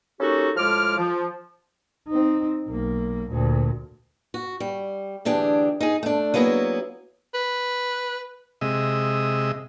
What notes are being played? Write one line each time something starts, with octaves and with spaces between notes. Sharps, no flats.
A#3 C#4 D#4 F#4 G4 A4
A2 F3 G#3 D6 F6
F3
C4 D#4
B1 A#3
D2 A#2
F#4
G3
D2 E3 D4 G4 G#4
D#4 G#4
A3 D4
F#3 A#3 B3 E4 G#4
B4
C3 G#3 D#5 E5